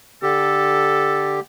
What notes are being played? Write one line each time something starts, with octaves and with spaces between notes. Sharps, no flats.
D3 G4 A4